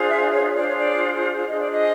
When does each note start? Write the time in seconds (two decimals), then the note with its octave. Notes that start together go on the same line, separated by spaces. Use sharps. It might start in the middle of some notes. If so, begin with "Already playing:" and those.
Already playing: D4 F4 G#4 C5
0.09 E5
0.31 C#5
0.55 D4 F4 G#4 C5 D5
0.68 C#5
0.79 D5
1.48 D4 F4 G#4 C5 D#5
1.60 D5
1.72 D#5